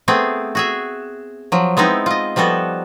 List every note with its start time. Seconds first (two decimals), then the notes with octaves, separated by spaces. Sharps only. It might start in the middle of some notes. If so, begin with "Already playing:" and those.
0.08 A3 B3 C4 G#4
0.55 F#4 G#4 E5
1.52 F3 F#3
1.77 G#3 B3 C4 D#4 E4
2.06 F4 D#5
2.36 F3 G3 B3 F#4 A4